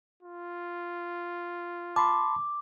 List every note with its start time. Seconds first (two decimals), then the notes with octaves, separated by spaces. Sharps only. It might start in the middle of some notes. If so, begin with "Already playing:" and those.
0.23 F4
1.96 A5 B5 C6 D6